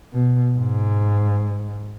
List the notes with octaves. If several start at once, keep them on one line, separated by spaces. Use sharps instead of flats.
B2
G#2